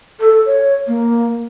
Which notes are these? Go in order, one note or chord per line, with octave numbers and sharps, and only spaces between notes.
A4
C#5
A#3